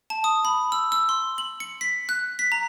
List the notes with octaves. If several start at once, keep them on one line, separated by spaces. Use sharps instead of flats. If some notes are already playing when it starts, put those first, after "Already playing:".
A5
D#6
B5
E6
E6
C6
F#7
C#7
B6
F#6
B6
A#5